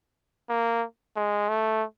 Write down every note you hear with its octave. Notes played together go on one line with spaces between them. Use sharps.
A#3
G#3
A3